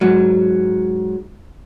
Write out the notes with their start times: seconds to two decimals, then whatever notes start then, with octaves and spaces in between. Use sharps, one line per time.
0.01 G#2 F#3